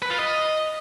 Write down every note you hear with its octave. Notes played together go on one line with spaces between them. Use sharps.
B4
F4
D#5